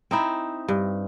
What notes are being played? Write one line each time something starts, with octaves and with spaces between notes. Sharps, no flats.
C4 D#4 E4
G2